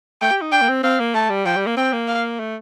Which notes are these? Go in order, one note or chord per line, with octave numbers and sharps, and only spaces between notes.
A3 G5
G4
D#4
D4 G5
A#3
C4
C4 F5
A#3
A3 A5
G3
F3 G5
G3
A#3
C4 G5
A#3
F5
A3